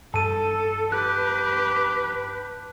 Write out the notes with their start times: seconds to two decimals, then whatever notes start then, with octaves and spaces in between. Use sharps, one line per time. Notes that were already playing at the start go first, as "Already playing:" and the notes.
0.14 G2 A4 A5 D#7
0.92 G4 B4 F#6